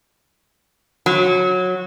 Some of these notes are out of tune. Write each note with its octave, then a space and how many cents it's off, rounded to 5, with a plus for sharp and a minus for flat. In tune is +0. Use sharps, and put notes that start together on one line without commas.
F#3 -15